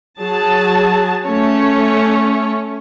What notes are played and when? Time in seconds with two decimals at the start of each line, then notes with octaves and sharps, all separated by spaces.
0.20 F#3 G#4 A5
1.25 A3 C#4 C#5